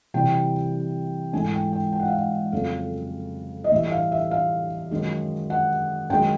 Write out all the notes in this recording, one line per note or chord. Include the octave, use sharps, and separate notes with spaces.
C3 E3 G3 G5
G#2 E3 A3 G#5
G5
G5
G5
F#5
F5
F#5
F2 C#3 F#3 A3 F5
D#5
A2 E3 G3 E5
E5
F5
E5
F5
F#2 D#3 G#3
F#5
F#2 D#3 G#3 G5